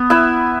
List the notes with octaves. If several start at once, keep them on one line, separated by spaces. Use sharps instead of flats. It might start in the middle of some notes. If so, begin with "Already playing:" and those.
Already playing: B3
E4 B4 E5